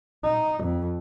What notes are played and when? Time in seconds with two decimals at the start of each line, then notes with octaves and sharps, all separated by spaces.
0.24 D#4
0.64 F2